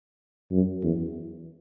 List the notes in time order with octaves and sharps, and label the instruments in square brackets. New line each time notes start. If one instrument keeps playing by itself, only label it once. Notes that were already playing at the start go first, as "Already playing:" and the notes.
[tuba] F#2
E2